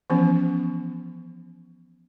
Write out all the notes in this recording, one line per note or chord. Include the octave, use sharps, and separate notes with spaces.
E3 F3 B3 C#4